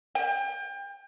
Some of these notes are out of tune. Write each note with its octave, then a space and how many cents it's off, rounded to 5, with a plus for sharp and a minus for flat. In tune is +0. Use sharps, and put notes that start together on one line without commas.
G5 +35